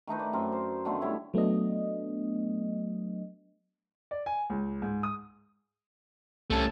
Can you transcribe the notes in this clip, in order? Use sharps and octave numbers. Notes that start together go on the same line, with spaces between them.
D#3 A3 D#4 B4
D5
F#2 C4 A#4
C5
D3 D#3 A3 B3
G3 E4 C#5
F#3 A3 B3 D4 D#5
D5
G#5
C#2
G#2
D#6
C2 A3 C#4 A5